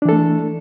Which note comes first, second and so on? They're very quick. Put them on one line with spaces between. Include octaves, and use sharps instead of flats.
D4 E3 A4 A3